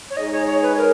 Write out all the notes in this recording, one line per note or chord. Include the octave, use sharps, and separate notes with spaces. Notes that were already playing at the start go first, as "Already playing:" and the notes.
C#5
G#3 D#4 G#4 D#5
C#5
C#5
B4
A#4